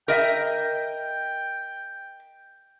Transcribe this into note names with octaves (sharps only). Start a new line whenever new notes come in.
A#4 D#5 E5 G5